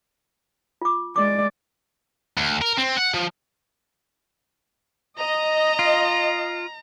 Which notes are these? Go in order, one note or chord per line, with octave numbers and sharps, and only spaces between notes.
F4 D6
G#3 D5 D6
D2
A#4
C4
F#5
F3
D#5 A#5
F4